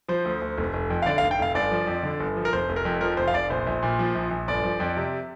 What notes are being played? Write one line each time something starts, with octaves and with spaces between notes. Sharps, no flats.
F3 C5
D2
D2
F1
F1
F2
F5
D3 D5
F5
F1
G5
F1 F5
G1 D5
F3
F2
D3
G1
F3
A#4
F1 C5
F1
A#4
F2
F3 A#4
F1 C5
F5
F1 D5
A#1 C5
A#1
A#2
F3
A#1
A#1
G1 D5
F3
F2
C3